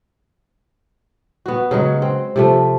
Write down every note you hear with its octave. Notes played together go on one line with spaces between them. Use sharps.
B3 F#4
C#3 F#3 G#3
C4
C3 F3 A3